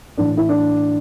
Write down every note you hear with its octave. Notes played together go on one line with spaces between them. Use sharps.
A2 E3 D4
E4
D4